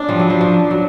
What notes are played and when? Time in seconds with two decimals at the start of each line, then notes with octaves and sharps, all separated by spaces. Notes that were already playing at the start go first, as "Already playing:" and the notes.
Already playing: B3 C#4 D4
0.09 F3 G3
0.20 F#3
0.30 F3
0.41 F3
0.71 F#3